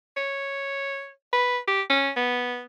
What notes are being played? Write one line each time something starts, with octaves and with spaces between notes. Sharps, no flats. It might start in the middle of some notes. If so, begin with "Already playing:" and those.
C#5
B4
G4
C#4
B3